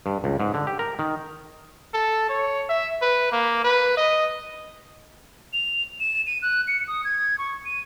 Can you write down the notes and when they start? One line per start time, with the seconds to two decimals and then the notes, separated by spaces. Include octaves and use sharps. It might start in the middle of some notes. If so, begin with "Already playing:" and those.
0.06 G2
0.24 C#2
0.40 G#2
0.54 D3
0.67 G4
0.79 A#4
0.99 D#3
1.94 A4
2.29 C#5
2.69 E5
3.02 B4
3.32 A#3
3.64 B4
3.97 D#5
5.53 F7
6.00 E7
6.27 D#7
6.42 F#6
6.68 C#7
6.88 D#6
7.04 G#6
7.38 C#6
7.65 D#7